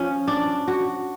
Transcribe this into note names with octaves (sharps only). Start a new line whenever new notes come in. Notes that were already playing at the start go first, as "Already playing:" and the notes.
Already playing: F3 C#4
D4
F#4